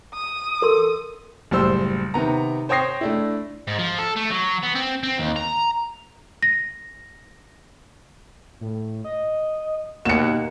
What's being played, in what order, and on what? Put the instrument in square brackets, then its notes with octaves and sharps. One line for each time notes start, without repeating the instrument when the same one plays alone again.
[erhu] D#6
[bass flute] A4 [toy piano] A#4 C6
[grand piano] F#1 A2 G3 C5 E6
C3 D#3 B3 A#5
C5 C#5 G5 D#6 A#6 C7
A3 D4 E4
[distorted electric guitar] G#2
F3
A4
A3
F#3
B3
C4
C4
D#2
A#5
[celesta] A#6
[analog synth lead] A2
D#5
[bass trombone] D#2 [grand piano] B2 A#3 [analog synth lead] F#5 [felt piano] C#7 E7